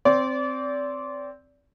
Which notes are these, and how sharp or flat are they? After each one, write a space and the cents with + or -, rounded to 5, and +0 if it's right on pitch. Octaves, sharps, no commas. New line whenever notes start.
C4 +0 D5 -30